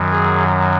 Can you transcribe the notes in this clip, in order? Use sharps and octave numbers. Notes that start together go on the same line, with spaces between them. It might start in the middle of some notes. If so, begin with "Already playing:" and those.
Already playing: F#2 D#3 F#3
G#4